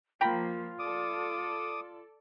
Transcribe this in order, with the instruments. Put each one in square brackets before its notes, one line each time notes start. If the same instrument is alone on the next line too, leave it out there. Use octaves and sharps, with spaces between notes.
[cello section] F3 A#3 [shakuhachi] F4 [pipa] G5 A#5 B5
[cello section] A4 D5 [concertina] D6 D#6